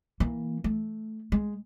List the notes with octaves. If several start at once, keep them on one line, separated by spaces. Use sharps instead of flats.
E3 A#3
A3
G#3